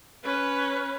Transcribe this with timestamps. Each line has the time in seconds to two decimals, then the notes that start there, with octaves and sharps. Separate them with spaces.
0.23 C#4 B4